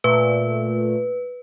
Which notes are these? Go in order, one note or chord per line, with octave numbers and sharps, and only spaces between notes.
A#2 A3 B4